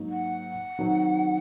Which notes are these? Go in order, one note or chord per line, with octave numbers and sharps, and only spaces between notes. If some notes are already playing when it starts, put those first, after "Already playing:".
Already playing: G#2 F#3 A#3 D#4
F#5
D#3 F#3 C4 D#4